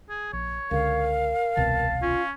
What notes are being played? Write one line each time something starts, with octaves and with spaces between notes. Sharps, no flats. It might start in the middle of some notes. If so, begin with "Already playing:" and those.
G#4
A#1 C#5
C#2 D3 A#4 F5
D#1 C2 B2 A5
C#4 F4